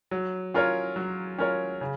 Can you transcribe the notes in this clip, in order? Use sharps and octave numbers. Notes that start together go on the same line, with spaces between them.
F#3
C#4 F4 A#4 C#5
F#3
C#4 F4 A#4 C#5
C#3